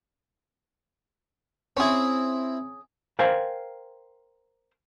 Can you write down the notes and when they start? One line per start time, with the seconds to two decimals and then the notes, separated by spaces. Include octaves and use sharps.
1.77 C4 C#4 E4 G#4
3.19 A#4 C5 F5 G5 G#5